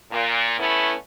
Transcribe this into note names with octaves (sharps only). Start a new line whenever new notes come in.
A#2
A3 B3 C#4 E4